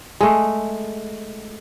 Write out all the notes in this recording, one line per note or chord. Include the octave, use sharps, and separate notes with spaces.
G#3 A3